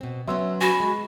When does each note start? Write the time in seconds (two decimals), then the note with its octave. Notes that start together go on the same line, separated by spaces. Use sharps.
0.01 B2 C4
0.28 F#3 B3 C#4 E5 C6 E6
0.61 F#4 G#5 B5
0.80 G#3